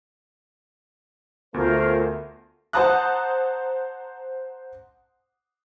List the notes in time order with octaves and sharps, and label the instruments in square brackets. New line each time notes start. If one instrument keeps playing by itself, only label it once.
[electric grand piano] D2 [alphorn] A3 [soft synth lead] B3 [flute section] F4 A#4 C5
[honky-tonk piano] C5 F#5 A5 A#5 D#6 F#6